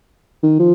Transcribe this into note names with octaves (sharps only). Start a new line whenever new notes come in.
D#3
F3